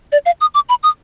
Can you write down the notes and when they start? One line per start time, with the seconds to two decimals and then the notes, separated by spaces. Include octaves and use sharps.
0.12 D5
0.26 F5
0.41 D#6
0.54 D6
0.69 B5
0.83 D#6